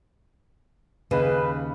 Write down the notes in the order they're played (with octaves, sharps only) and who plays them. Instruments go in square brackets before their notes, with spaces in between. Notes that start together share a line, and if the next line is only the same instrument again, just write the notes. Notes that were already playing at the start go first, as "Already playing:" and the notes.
[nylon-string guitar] D#2 C#3 G#5 [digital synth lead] B4